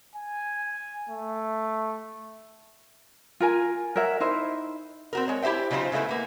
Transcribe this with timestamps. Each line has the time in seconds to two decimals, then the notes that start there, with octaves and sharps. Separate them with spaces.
0.16 G#5
1.09 A3
3.40 F4 A#4 G#5
3.96 A#4 C#5 E5 F#5
4.20 D#4 E4 C5 E5
5.13 C4 F#4 A#4
5.28 G#3 C#5
5.43 E4 G4 C5 E5 G5
5.71 C#3 F#3 D#4 F4 C5
5.92 C#3 G#3 A3 B3 E4
6.09 A#3 B3